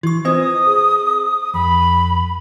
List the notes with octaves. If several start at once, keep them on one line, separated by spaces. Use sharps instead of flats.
E3 E4 C#6
C4 F4 B4 C5 D#5 D#6
G#4
F2 B5